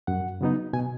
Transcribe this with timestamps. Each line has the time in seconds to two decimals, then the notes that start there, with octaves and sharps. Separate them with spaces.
0.07 F#2 F#5
0.41 C#3 F#3 B3 D#4
0.73 B2 G#5